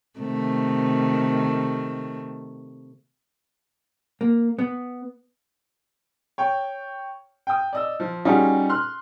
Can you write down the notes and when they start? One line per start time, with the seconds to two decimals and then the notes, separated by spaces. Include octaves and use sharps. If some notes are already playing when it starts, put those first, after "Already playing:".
0.20 C3 D#3 A3
4.21 A#3
4.59 B3
6.38 C#5 G5
7.47 G5 D#6
7.73 D5 D#5 E6
8.00 F3
8.25 G3 C#4 D#4 F4 F#4 G#4
8.70 C6 F6 F#6